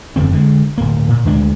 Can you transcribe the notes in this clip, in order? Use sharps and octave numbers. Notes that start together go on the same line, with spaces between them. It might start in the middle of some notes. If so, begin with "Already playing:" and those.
F#1 E2 D3 C4
D3 G#3
D1 A#3
A#2
D2 G#3 D4